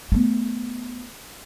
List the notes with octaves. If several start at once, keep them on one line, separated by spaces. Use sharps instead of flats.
A3 B3